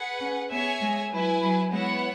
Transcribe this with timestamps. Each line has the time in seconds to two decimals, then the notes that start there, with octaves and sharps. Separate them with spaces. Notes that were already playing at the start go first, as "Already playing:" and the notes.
Already playing: G#4 B4 F#5
0.20 C#4
0.51 B3 G#4 C#5 E5 G#5
0.81 G#3
1.11 F#3 E4 B4 G#5
1.42 F#3
1.72 G#3 B3 E4 C#5 F#5